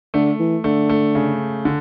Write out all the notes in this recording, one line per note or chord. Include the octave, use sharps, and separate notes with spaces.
D3 A3
E3
D3 A3
A3
C#3
D3